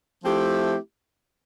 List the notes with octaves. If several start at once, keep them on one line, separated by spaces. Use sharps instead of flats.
F3 A3 C4 E4 G4